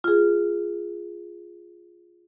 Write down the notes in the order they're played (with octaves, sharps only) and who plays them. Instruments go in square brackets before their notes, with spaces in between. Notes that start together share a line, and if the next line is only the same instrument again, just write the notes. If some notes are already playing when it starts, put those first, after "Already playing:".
[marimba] F4 G#4